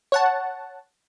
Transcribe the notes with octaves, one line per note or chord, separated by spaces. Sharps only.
C#5 F#5 A5